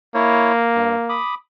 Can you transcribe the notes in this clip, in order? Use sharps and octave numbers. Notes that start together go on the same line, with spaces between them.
A#3 E4 C#5
G2
B5 D6 D#6